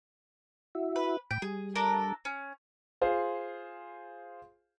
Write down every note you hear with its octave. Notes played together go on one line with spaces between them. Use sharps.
E4 F#4 E5
B4
A2 G5 B5 D6
G3 G#4
D4 A4 A#4
C#4
F4 G#4 C5 F5